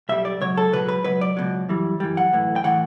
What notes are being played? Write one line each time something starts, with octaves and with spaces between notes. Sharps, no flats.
B1 B2 G3 E5
D5
C#2 B2 F#3 C#5
A4
C#2 B2 F#3 B4
B4
C#2 B2 F#3 B4
D5
C#2 B2 F#3
F#2 E3 G3
F#2 E3 G3
F#5
B1 A2 E3
G5
A2 E3 F#5